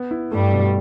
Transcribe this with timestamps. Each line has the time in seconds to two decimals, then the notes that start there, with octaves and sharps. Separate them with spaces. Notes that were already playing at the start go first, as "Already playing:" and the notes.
Already playing: B3
0.11 E4
0.32 G2 G3 A3
0.53 B2